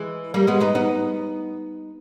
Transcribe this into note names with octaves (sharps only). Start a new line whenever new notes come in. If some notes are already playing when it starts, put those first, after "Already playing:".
Already playing: E3 G#3
G3 A#3
G#3 B3
B3 D#4
B3 D#4